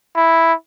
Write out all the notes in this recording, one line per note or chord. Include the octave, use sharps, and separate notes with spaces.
E4